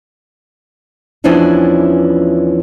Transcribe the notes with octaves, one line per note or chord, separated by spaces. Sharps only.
E2 E3 F3 C#4 D4 E4